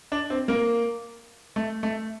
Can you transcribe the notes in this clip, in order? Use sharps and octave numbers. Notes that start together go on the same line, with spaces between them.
D4
C4
A#3
A3
A3